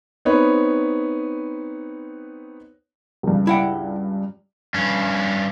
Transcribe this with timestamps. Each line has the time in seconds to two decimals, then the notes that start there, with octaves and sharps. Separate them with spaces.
0.25 B3 C4 D#4 B4 C#5
3.23 C#2 G2
3.47 E4 F#5 G5
4.74 G2 C#4